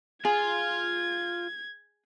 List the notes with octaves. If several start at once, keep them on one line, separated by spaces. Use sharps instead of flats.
F4 G#4 G#6